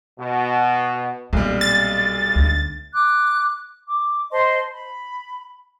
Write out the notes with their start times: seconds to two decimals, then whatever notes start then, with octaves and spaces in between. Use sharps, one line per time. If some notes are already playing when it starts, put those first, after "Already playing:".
0.19 B2
1.33 B1 A#2 G3 A3 C4
1.61 A6
2.35 D2 D4
2.94 D6 F#6
3.87 D6
4.32 C5 D#5 A5 C6
4.74 B5